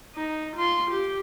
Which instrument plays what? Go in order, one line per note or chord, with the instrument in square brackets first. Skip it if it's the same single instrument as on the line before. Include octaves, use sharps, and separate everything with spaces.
[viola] D#4
F4 C6
G4